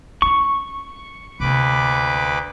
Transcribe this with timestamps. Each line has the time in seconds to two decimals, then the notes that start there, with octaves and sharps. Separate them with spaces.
0.22 C#4 E4 C#6
1.40 D2 C3 A#3 B4 D6